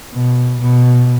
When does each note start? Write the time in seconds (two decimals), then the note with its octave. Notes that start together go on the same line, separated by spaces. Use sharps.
0.13 B2
0.60 B2